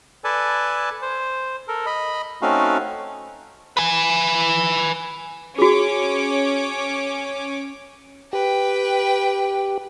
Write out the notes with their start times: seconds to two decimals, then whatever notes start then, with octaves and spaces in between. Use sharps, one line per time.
0.24 A4 B4 D5 G#5 A5
1.02 C5
1.68 A4 A#4
1.86 D#5 B5
2.42 A3 C4 C#4 D#4 F#4 F5
3.77 B4 G#5
5.59 C#4 F#4 G#4 C#5 D6
8.33 G4 B4 G5